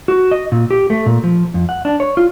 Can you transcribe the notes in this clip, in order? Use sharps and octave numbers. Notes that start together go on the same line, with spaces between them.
F#4
D#5
A#2
G4
A3
A#2
F3
F2
F#5
D4
C#5
F4